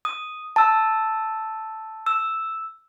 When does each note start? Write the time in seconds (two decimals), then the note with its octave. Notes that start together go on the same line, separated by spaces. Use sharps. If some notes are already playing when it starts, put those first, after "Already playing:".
0.05 D#6
0.56 A5 E6
2.06 E6